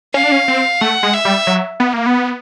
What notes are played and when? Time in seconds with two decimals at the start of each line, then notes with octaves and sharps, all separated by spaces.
0.14 C#4 F5
0.23 D4
0.32 C#4
0.48 C4
0.81 A3 F#5
1.03 G#3
1.13 E5
1.25 G3
1.47 F#3
1.80 B3
1.93 A#3
2.06 B3